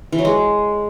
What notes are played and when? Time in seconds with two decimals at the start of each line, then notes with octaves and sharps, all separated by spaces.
0.12 E3
0.19 F#3
0.25 G#3